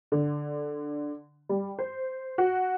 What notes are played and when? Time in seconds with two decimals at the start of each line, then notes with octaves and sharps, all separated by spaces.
0.12 D3
1.49 G3
1.79 C5
2.38 F#4